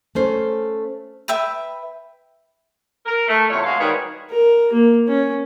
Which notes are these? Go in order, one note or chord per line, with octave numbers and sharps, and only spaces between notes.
A3 C#4 C5
B4 E5 G5 B5
A#4
A3
E2 C3 F4 C#5
G#3 F#4 F5
D#3 G3 F#4 G#4 B4 C#5
A#4
A#3
C#4